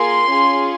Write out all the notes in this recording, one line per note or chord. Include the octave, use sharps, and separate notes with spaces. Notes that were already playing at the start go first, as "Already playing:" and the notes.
Already playing: A#3 F4 G#4 C6
C#4 F4 G#4